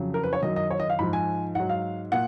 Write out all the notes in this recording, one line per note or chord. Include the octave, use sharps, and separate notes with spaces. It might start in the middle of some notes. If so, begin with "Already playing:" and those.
Already playing: F2 C#3 F#3
A#4
B4
C#5
F#2 D#3 F#3 D#5
D#5
C#5
D#5
F5
G#2 F3 B5
G#5
G#2 F#3 F#5
F5
A#2 F#5